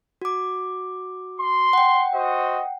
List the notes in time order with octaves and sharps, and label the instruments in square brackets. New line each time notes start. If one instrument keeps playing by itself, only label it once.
[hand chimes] F#4 D6
[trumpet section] C6
[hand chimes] F#5 G5
[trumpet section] F#4 C5 D#5